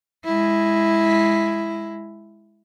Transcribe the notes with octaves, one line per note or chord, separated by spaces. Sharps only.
G#3 E4